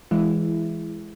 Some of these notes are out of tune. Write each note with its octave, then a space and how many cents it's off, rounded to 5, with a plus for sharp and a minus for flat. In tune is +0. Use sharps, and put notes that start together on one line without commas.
E3 +0 G#3 +0 E4 +15